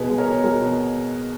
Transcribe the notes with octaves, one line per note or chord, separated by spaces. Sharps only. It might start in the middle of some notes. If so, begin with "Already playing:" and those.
Already playing: B2 G#4 B4
G#3
A#4 C#5
B2
G#3 F#4 A#4
B2